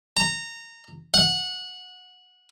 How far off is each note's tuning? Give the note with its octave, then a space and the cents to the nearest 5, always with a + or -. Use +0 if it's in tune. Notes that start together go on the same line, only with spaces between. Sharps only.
A#5 -20
F#5 -20